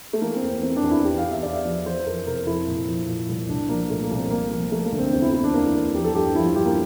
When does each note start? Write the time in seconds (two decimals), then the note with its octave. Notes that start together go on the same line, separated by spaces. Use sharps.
0.13 A3
0.22 E3 A#3
0.36 C4
0.43 E2
0.49 C4
0.63 E3 C4
0.76 D4
0.83 E2
0.91 E4
1.04 E2 G4
1.18 F5
1.25 E2
1.31 E5
1.42 E2 D5
1.54 E5
1.65 F3
1.86 E3 C5
2.06 F2 A#4
2.26 C3 A#4
2.46 F2 E4
2.67 A#2
2.88 F3
3.08 A#2
3.29 C2
3.49 C2 D4
3.69 F3 A#3
3.90 A#2 A3
4.03 A#3
4.11 C2
4.17 C4
4.30 F3 A#3
4.51 F3
4.72 F3 A3
4.85 A#3
4.92 D2
4.99 C4
5.12 E2 C4
5.22 E4
5.33 E2 E4
5.44 D4
5.53 E2 A#3
5.74 E2
5.94 F3 G4
6.04 A4
6.15 G2 G4
6.35 F3 E4
6.45 F4
6.55 G2 G4
6.65 A#3